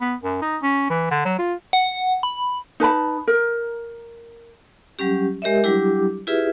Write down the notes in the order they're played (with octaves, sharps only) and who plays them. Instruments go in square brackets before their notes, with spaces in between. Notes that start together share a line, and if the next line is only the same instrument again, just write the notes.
[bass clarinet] B3
F#2
D#4
C#4
E3
D3
F#3
F4
[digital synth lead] F#5
B5
[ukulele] D#4 B4 A5 B5
A#4
[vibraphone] F#3 G3 C#4 G4
G#3 G4 A#4 C#5 D#5 E5
F#3 G3 D4 E4 G4 D6
E4 F4 G4 G#4 B4 E5